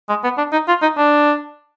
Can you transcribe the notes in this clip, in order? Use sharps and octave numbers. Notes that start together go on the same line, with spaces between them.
G#3
B3
D4
D#4
F4
D#4
D4